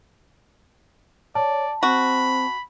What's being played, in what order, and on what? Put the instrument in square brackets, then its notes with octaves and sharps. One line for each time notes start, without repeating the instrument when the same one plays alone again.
[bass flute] C#5 [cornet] D5 [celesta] A5
[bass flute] C4 [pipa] F#4 [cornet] B5